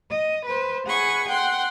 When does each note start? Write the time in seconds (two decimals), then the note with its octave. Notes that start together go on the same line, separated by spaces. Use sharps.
0.10 D#5
0.45 B4 C5
0.87 G#4 F#5 B5 C#6
1.29 F#5 G5 C6